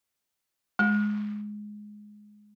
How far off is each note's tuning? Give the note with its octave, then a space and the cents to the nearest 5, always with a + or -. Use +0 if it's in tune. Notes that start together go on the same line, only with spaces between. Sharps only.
G#3 +10